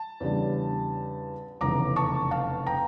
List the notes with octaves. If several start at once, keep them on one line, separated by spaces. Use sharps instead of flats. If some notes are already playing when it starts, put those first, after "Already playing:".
Already playing: A5
E2 C#3 G3 D4
F1 E2 C#3 A#5 D6
A5 C#6
F5 A5
G5 A#5